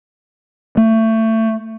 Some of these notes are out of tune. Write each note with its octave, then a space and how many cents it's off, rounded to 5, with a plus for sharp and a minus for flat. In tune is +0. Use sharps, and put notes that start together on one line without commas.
A3 +25